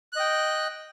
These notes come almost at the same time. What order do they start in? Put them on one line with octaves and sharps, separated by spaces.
F#6 D#5 G5